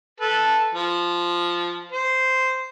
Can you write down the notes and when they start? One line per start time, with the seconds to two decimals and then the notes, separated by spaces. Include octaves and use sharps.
0.21 A4 B4
0.75 F3
1.92 C5